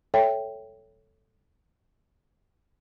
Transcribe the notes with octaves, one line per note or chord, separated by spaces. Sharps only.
A4 C#5 E5 G5